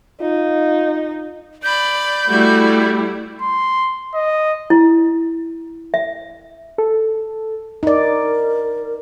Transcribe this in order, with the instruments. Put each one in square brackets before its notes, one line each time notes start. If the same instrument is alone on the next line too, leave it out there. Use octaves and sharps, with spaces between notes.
[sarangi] D#4 [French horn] F4
[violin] D5 B5 [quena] G6
[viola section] G3 A3 E4 [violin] F#4
[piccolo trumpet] C6
D#5
[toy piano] E4
E5
[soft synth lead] A4
[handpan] D#4 D5 [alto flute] A#4